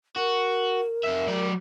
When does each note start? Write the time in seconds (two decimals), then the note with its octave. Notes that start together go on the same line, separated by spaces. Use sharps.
0.16 F#4 A#4
1.03 F2 E5
1.27 F#3 D5